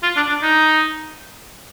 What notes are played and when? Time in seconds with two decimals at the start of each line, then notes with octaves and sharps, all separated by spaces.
0.03 F4
0.16 D4
0.29 D4
0.42 D#4